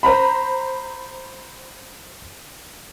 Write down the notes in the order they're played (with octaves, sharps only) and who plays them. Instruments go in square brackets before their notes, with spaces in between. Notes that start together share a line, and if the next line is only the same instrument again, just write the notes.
[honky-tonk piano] C5 A#5 B5